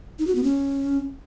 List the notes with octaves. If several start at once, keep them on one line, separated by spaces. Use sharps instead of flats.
D#4
F#4
B3
C#4